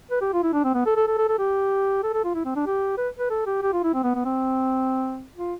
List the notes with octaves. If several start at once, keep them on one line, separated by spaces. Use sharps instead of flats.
B4
G4
F4
E4
D4
C4
B3
A4
A4
A4
A4
A4
G4
A4
A4
F4
E4
C4
D4
G4
B4
B4
A4
G4
G4
F4
E4
C4
B3
B3
C4
F4